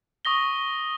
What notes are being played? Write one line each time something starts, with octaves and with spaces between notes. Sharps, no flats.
C#6 D#6 A#6 G7